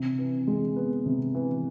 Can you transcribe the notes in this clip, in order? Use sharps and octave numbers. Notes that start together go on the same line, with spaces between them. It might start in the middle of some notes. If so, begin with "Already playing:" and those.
Already playing: C3
E3
G#3
B3
C3
E3